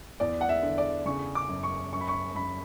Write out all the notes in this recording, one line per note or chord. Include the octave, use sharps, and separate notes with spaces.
E2 D5
F#5
E5
D3
D5
C#3 C#6
D6
F#2
C#6
F#2 C#6
B5
C#6
F#2 B5